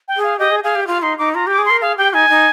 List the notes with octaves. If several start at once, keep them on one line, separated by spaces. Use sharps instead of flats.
G5
G#4
F5
G4 D#5
G#4
G#4 F5
G4
F4 F5
D#4 C6
D#4 D6
F4 A#5
G4 D6
G#4
A#4 C6
G#4 F5
G4 G5
D#4 G#5
D#4